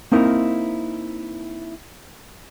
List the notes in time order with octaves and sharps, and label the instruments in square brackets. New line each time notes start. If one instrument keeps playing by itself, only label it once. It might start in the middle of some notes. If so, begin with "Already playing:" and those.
[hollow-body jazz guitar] A#3 C4 D#4 E4 A#4